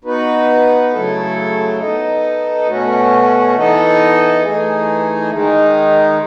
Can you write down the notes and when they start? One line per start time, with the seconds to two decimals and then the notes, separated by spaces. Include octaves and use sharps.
0.04 B3 D#4 F#4 B4
0.92 C#3 F#3 A3 E4 A4
1.80 B3 D#4 A4 D#5
2.67 B2 A3 C#4 F#4
3.56 E3 B3 D#4 A4 D#5
4.42 E3 A3 D#4 G#4
5.30 D#3 G#3 D#4